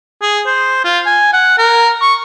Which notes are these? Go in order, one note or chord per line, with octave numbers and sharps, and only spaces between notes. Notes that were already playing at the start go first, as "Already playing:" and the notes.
G#4
C5
F4
G#5
F#5
A#4
C#6